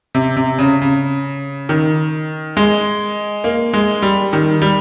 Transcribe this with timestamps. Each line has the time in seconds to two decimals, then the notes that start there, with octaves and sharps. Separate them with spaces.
0.15 C3
0.37 C3
0.58 C#3
0.82 C#3
1.69 D#3
2.57 G#3
3.44 A#3
3.73 G#3
4.02 G3
4.33 D#3
4.62 G3